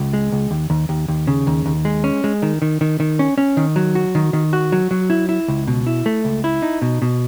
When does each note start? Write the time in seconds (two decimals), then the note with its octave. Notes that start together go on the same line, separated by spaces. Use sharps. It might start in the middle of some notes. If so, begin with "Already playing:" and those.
Already playing: C#2
0.13 G#3
0.32 C#2
0.51 D#2
0.70 D#2
0.89 D#2
1.08 D#2
1.27 C#3
1.47 D#2
1.66 D#2
1.85 G#3
2.04 C#4
2.24 G#3
2.42 D#3
2.62 D#3
2.81 D#3
3.00 D#3
3.19 C#4
3.38 C#4
3.57 D#3
3.76 F#3
3.95 F#4
4.15 D#3
4.33 D#3
4.53 F#4
4.72 F#3
4.91 F#3
5.10 E4
5.29 E4
5.48 C#2
5.67 B2
5.87 E4
6.06 A3
6.25 C#2
6.44 E4
6.62 D#4
6.82 B2
7.02 B2